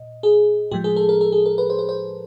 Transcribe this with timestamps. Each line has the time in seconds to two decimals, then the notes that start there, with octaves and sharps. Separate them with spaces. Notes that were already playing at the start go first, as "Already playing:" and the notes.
Already playing: A#2 D#5
0.23 G#4
0.71 A2 F3 G#3 G4
0.84 G#4
0.96 A4
1.09 A#4
1.21 A4
1.32 G#4
1.46 A#4
1.58 B4
1.70 C5
1.79 B4
1.89 C5